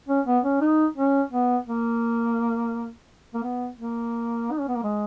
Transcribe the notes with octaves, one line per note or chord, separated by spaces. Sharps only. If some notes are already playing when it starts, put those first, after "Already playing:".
C#4
B3
C#4
D#4
C#4
B3
A#3
A#3
B3
A#3
D#4
C#4
B3
A#3
G#3